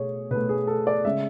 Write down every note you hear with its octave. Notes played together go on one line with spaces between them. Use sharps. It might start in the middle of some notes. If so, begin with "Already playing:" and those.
Already playing: B2 A3 G#4 C#5
B2 B4
A3
G#4
A4
D5
C#3 G#3 E5